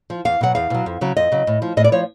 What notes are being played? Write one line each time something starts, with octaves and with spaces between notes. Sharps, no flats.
F3
E2 F5
B2 F#3 F#5
E2 F5
B2 F#3
F2
C#3 F#3
F2 D#5
C#3 F#3
A2
F3
A2 D#5
D5
F3 C#5